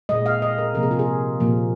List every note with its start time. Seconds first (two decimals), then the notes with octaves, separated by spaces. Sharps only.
0.09 A#2 G#3 D#5
0.26 F5
0.42 D#5
0.58 A#4
0.74 C3 F3 A#3 A#4
0.83 G#4
0.91 F4
0.99 G#4
1.40 A#2 F3 A#3